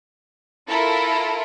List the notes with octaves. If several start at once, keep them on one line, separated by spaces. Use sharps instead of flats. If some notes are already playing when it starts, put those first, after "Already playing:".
E4 F4 A4 A#4